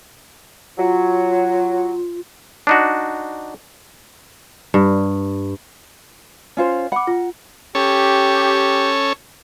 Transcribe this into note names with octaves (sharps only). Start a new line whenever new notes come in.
F#3 F4
D4 D#4 F#4
G2
C#4 F4 C5
F#5 B5 D6
F4
C#4 G4 A4 C#5